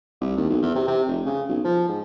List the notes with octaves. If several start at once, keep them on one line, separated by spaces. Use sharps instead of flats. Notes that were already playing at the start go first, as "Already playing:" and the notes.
C2
D#2
B1
E2
C3
C3
F1
C#3
B1
F3
G#2